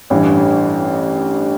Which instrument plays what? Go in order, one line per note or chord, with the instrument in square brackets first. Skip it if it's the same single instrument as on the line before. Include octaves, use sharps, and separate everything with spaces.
[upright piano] A1 G2 E3